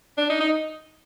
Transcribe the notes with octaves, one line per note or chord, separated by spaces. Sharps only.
D4
D#4
D#4